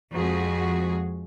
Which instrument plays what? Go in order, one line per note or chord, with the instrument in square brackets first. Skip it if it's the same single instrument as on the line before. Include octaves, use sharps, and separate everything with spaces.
[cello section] F2 G#3 F#4 G#4